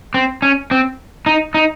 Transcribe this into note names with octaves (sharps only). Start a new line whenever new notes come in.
C4
C#4
C4
D#4
D#4